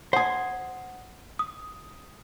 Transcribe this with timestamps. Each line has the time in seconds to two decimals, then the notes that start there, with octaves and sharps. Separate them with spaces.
0.13 C5 F#5 G#5 D#6
1.39 D#6